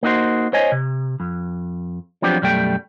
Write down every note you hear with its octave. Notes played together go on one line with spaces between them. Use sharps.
A#3 D#4 F#4 C5
C5 C#5 D#5 G#5
C3
F2
F3 F#3 B3 C4 D4 G4
B1 F#2 G3 A3 G5